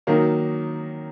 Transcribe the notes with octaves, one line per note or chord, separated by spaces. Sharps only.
D#3 F#3 A#3 D#4